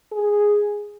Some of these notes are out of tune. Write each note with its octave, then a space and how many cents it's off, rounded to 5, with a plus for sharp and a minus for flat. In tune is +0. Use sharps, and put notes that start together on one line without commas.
G#4 -5